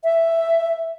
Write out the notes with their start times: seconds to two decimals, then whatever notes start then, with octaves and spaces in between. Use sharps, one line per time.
0.04 E5